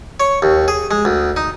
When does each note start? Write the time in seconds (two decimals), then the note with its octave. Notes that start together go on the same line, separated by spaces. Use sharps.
0.20 C#5
0.42 D#2
0.68 G#4
0.91 G#3
1.05 D2
1.37 D#4